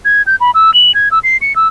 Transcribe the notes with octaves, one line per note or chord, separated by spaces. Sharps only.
G#6
G6
B5
E6
F#7
G#6
E6
C7
C#7
E6